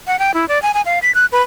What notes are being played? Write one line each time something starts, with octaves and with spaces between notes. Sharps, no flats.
F#5
G5
E4
D5
G#5
G#5
F5
B6
F#6
B4